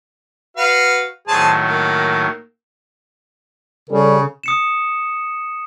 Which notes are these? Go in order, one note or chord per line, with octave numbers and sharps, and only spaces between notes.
F#4 B4 F5
A2 D#3 F#3 G#4 C5 A5
A#3
C#3 G3 C#4 A4
D#6 C#7 E7